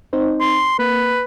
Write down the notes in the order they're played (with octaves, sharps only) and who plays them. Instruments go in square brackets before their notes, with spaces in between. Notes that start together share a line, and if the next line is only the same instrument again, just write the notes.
[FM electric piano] C4 D#4 C5
[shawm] C6
[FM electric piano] A#3 [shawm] B4